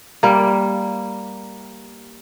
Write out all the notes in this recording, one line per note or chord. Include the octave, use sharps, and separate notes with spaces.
G3 A#3